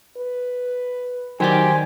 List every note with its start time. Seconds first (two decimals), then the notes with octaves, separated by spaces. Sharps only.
0.17 B4
1.40 D#3 F#3 D#4 G4 C5 D5 G#5 D6